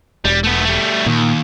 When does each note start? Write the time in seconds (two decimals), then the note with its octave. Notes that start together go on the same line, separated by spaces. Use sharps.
0.25 E1 G3
0.44 A3 B3
0.65 G3 A3
1.06 D#2 A#2